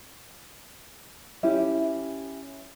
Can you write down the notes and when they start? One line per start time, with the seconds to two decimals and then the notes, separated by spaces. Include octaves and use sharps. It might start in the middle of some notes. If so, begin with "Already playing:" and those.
1.43 C#4 E4 G4 E5